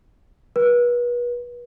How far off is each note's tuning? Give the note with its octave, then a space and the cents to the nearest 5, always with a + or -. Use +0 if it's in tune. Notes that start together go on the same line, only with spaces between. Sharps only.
B4 -35